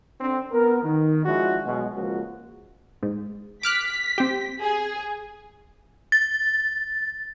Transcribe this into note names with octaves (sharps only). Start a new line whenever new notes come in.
D3 C4
B3 A#4
D#3
F3 G#3 D4 E4 F#4
B2 F#3 G#3
C#2 F3 G#3 A#3 F#4
G#2
D6 F6 F#6 B6
C4 G4
G#4
A6